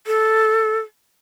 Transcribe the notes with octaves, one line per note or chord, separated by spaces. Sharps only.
A4